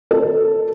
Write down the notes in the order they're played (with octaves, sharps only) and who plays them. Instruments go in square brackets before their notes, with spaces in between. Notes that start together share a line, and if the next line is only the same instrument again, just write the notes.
[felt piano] A4